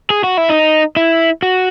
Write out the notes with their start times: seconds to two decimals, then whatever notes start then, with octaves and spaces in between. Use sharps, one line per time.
0.10 G#4
0.24 F#4
0.37 E4
0.50 D#4
0.97 E4
1.43 F#4